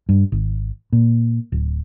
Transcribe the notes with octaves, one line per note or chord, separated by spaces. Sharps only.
G2
G#1
A#2
D1